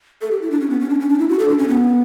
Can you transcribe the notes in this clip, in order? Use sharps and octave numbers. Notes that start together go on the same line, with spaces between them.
A4
G4
E4
D4
C#4
B3
C#4
D4
C#4
D4
E4
F#4
A4
D4
C#4
B3